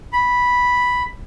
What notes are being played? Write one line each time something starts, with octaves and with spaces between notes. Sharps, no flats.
B5